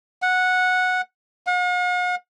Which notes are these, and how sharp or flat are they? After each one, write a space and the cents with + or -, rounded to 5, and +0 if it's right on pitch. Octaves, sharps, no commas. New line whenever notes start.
F#5 -10
F#5 -45